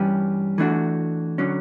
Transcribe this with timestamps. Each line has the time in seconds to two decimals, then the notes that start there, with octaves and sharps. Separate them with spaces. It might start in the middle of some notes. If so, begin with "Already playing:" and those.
Already playing: G2 E3 G3 C#4 G4
0.58 E3 A3 D4 F#4
1.38 D3 F#3 C#4